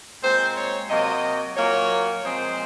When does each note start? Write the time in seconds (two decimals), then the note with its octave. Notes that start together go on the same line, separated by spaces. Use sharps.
0.22 A#2 G#3 C4 C5
0.55 C#5
0.89 C3 F#3 A#3 D#5
1.56 A#2 F#3 A#3 C#5
2.22 A#2 F3 G#3 C4 C5